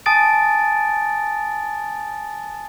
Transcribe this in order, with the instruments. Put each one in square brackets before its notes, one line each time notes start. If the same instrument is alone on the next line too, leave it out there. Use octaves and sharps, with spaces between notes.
[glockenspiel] G#5 A5 D#6 A6 D7